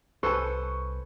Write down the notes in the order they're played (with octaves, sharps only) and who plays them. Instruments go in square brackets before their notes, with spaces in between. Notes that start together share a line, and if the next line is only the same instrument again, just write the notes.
[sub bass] C2 [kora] A4 [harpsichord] B4 C5 G#5 [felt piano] C#6